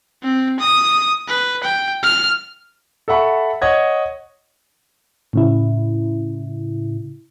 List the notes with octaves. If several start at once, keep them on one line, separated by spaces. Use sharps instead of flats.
C4
D#6
B4
G5
F6
A4 E5 F#5 B5 C#6
C#5 D#5 F#5 G#6
A2 C#3 E4